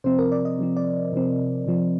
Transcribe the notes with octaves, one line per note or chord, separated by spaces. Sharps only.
C3 F3 C4 C5
A#4
D5
D#5
C3 F3 C4
D5
C3 F3 C4
C3 F3 C4